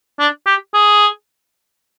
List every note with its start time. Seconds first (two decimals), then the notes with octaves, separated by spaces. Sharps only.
0.19 D4
0.46 G4
0.74 G#4